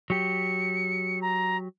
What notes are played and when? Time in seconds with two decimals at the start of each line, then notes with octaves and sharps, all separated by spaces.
0.10 F#3 G4 C#7
1.22 A#5